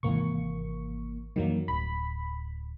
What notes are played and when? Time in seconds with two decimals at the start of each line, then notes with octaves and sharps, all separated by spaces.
0.03 G#1 C3 E3 A#3 C#6
1.36 F#2 D#3 E3 F#3 G3 A#3
1.68 D1 B5